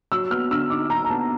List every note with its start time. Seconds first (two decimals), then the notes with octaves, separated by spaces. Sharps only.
0.12 F#3 E6
0.31 B3 F6
0.51 D3 E6
0.70 D#4 D6
0.90 F#3 A#5
1.05 A#5
1.10 B3 A5